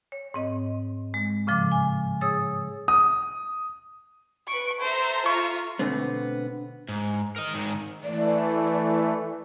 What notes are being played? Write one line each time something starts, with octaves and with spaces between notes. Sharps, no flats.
C#5
G#2 C4 D#5
G#3
A2 C#3 F3 D6
G#5
G#4 C#5 D#6 E6 A6
D#6
B4 C#6 D7
A4 C5 E5 A#5
F4 C#6
B2 D3 A3 B3 C4
G#2
A#4 D#5
G#2 D#3
E3 A3 D5